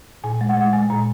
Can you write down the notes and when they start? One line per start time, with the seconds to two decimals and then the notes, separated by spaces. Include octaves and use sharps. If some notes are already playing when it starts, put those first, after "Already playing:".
0.24 A#2 G#5
0.41 G#3
0.49 F#5
0.57 G#3
0.73 G#3 G#5
0.90 A#2 A#5